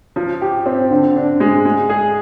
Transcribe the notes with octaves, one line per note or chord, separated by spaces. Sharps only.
F3
G4
C4
D3
D4
G#3
G#3
G#4